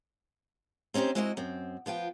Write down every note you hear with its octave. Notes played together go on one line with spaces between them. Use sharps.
C4 C#4 D#4 G4 C5
G#3 C4 E4 F#4 B4 D#5
F#2 C4
F3 B3 F4 G5